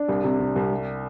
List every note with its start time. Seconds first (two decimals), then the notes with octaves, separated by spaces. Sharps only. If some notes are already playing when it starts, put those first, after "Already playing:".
Already playing: D4
0.08 C2
0.24 C3
0.39 C3
0.56 C2
0.71 G3